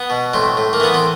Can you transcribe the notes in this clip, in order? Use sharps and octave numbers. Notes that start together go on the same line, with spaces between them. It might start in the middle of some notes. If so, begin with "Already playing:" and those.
Already playing: B3
B2
A2 C4
A2
A#3
E3 B3
C4